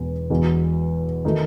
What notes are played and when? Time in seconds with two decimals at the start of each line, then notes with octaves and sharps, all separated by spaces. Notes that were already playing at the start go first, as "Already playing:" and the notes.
Already playing: E1 E2 B2
0.30 E1 E2 B2
1.25 D#3 A3 D#4